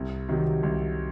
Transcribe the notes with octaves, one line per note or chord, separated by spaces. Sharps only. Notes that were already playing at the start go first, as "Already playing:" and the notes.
Already playing: C2
C3 D#3 F#3
C2